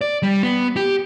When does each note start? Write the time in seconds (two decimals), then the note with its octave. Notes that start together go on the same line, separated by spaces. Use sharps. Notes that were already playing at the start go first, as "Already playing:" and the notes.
0.01 D5
0.23 G3
0.43 B3
0.77 G4